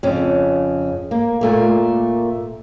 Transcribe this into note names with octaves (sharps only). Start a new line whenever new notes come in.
F2 C#3
A#3
A#2 A3 A#3